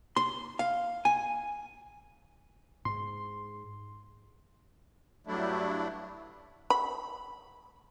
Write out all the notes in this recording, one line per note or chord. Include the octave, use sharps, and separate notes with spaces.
C6
F5
G#5
G#2 C6
G2 F#3 A3 D4 E4
B5